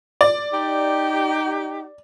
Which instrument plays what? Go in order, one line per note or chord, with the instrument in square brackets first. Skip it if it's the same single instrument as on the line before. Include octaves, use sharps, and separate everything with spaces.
[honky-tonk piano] D5
[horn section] D#4 G4